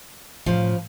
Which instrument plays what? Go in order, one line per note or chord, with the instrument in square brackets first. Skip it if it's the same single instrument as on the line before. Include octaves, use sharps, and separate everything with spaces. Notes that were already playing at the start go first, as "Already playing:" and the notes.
[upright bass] A2 [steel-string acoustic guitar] C#3 F3